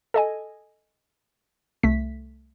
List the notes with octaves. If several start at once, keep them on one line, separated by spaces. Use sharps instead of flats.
A4 D#5 G#5
C2 A3 B6